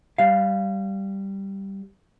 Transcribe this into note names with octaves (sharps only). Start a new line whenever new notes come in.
G3 F5